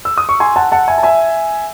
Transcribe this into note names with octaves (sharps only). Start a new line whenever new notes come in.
E6
D#6
C#6
G#5 C6
F#5 A5
F#5 A5
E5 G#5
A5
E5 G#5